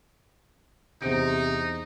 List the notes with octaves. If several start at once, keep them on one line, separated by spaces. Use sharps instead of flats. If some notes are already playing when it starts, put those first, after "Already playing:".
E2 C3 D#4 C5 D7